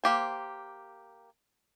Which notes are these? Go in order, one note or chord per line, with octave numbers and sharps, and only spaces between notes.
A#3 G4 C5